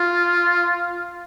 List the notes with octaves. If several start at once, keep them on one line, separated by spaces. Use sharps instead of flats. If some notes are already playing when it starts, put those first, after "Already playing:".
Already playing: F4